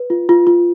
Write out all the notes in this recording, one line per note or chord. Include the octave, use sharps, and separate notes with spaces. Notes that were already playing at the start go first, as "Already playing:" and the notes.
Already playing: B4
F4
F4
F4